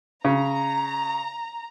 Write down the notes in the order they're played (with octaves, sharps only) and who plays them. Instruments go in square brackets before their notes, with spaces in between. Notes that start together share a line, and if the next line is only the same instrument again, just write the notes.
[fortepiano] C#3 [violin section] A#5